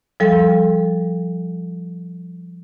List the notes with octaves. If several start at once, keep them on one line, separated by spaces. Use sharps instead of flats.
F3 G3 A4